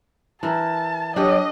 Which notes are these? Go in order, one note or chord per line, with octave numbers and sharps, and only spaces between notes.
E3 E4 A#4 A5
F#3 D4 G4 A4 D#5